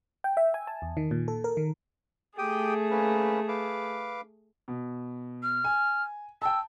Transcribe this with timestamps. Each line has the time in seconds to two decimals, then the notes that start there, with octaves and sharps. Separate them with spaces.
0.24 G5
0.37 E5
0.54 G#5
0.67 A5
0.82 E2
0.97 D#3
1.11 A#2
1.28 A4
1.44 A#4
1.57 D#3
2.38 A3 G4 G#4 G5 D#6
2.91 A#3 C#4 B4
3.48 B4 F5 D6
4.68 B2
5.43 F6
5.64 G#5
6.42 G5 A5 E6